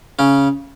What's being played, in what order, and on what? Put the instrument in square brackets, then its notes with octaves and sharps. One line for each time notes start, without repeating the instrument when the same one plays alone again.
[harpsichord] C#3 C#4